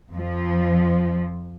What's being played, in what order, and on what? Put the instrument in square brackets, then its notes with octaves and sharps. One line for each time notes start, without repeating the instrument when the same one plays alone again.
[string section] F2 F3